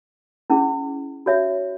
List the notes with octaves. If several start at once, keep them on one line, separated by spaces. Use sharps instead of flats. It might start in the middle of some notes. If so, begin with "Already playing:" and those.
C#4 E4 G#4
F#4 C#5 E5